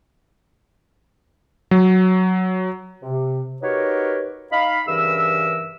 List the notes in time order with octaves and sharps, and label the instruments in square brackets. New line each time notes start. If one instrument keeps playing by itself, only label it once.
[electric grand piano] F#3
[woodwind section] C3
D#4 F#4 G4 A#4 B4 C#5
D#4 F5 B5
G2 C#3 E3 A#4 E5 E6